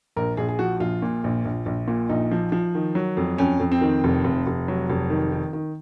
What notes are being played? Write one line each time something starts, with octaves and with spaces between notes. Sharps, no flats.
A#1 A#4
A#1 G#4
G#4
F3 F#4
A#1 F4
A#2
A#1
A#1
A#1
A#2
A#1 D#4
F3
F3
D#3
F#3
F2
F2 C#4
F2
C4
D#3
F1
F1
F1
F#3
F1
D#3
D#3
D#3